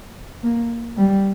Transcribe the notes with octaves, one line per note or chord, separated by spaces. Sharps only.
A#3
G3